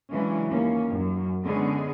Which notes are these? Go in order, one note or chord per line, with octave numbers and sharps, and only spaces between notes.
C#3 E3 F#3 G#3 C#4 D4
D#2 A#3 C#4
F#2
D3 G#3 B3 C#4 G#4